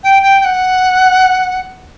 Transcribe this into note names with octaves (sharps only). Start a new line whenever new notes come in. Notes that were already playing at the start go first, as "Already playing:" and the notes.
G5
G5
G5
F#5